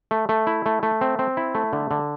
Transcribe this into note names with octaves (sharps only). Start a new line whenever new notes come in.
A3
A3
E4
A3
A3
C4
C4
E4
A3
D3
D3